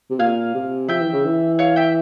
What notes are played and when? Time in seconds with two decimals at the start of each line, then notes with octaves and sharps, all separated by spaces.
0.10 C3
0.19 A#2 F5 G#5
0.55 C3
0.88 F3 E5 G5
1.01 E3
1.13 C#3
1.25 E3
1.59 C#5 F5
1.76 E5 G5